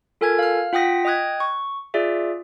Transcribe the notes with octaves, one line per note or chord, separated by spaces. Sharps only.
F4 A4 A#4 G#5 F6 G#6
F5 F6
F4 F#5 G5 D#6 A#6 B6
D#5 G5 D#6 F#6 G#6
C#6
F4 G#4 D5 E5